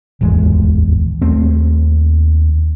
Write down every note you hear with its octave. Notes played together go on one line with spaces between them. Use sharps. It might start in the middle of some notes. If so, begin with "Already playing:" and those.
D1 G#1 E2 G#3
D#2 A3 C4